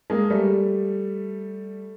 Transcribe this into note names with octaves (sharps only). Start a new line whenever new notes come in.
G#3 A#3
G3 A3